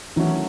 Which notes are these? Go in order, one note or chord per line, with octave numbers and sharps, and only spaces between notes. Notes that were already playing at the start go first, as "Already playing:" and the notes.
D#3 E3 F#3 A3 C#4 F#4